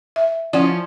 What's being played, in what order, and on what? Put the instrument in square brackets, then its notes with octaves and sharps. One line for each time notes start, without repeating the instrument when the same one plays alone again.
[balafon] E5
[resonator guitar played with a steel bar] F3 C#4 [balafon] E4 F#5 [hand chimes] D5